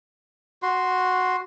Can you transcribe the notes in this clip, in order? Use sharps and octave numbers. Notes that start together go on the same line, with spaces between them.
F#4 C6